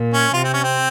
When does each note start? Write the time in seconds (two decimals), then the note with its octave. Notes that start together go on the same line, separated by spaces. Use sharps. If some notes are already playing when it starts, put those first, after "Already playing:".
Already playing: A#2
0.14 C#4
0.34 C3 F4
0.44 C4
0.53 C#4
0.64 C4